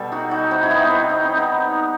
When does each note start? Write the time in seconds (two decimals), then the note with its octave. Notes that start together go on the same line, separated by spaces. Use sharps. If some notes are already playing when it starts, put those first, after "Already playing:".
Already playing: B2 G3 A4
0.12 D#4 F#4
0.31 D#4 F#4
0.51 C4 E4
0.63 E4
0.71 B3 D#4
0.84 B3
0.91 C4
1.10 D#4
1.23 C4
1.37 B3 D#4